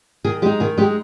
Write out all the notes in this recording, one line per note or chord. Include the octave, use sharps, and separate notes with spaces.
D#3 G#4
G#3 D#4 G4
D#3 G#4
G#3 D#4 G4